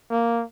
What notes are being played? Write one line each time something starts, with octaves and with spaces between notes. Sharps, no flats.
A#3